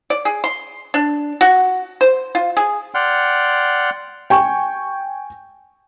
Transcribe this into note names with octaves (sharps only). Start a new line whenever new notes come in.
D5
G#4
C6
D4
F#4
C5
F4
G#4
D5 F#5 G5 C6 F6 F#6
G5 G#5 C#6